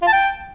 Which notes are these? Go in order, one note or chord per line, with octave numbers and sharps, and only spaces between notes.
F4
A5
G5